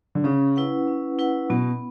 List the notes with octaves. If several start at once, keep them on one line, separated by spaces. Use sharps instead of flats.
D3
C#3 C#4
E4 B4 F#5
C#4
E4 B4 F#5
B2 B3